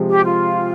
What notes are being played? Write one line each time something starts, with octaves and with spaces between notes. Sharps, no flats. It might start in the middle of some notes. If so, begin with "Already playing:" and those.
Already playing: C3 F3 G#3
G4
F4